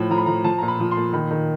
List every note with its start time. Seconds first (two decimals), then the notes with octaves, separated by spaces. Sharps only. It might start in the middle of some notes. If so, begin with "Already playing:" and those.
Already playing: A2 F3 B5
0.10 F3 A#5
0.18 B5
0.26 F3 A#5
0.44 F3 A5
0.58 A#2 A#5
0.68 B5
0.80 F3
0.91 C6
0.97 A#2
1.13 D#3 B5
1.31 D#3